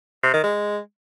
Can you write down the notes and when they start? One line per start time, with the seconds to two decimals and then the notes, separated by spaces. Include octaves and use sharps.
0.23 C3
0.34 D#3
0.44 G#3